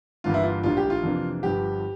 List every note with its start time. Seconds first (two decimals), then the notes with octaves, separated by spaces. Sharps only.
0.24 G1 G2 E3 A#3 F4
0.34 E4
0.43 F4
0.63 A#1 A2 G3 A#3 D4 F4
0.77 G4
0.90 F4
1.03 F2 C3 E3 A#3 D4
1.43 G1 G2 F3 G4